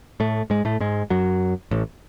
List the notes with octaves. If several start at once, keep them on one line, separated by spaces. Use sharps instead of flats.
A2 A3
G#2 G#3
A2 A3
G#2 G#3
F#2 F#3
A1 A2